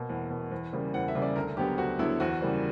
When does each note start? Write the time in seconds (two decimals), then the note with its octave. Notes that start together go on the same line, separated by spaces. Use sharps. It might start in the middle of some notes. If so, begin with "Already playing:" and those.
Already playing: B2 A#3
0.09 E2
0.30 B2 A#3
0.52 E2
0.73 C#3 G3 A#3
0.94 E2 F#5
1.08 E5
1.15 C#3 G3 A#3
1.22 D5
1.36 D2 A#4
1.57 D3 F#3 B3 G4
1.78 D2 F#4
1.99 D3 F#3 B3 E4
2.20 E2 F#4
2.41 C#3 E3 G3 A#3